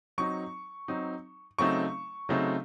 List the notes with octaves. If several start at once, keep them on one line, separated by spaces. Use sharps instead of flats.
F#3 C4 D#4 C#6
F#3 C4 D#4
C#3 F#3 A3 C4 D#4 C#6
C#3 F#3 A3 C4 D#4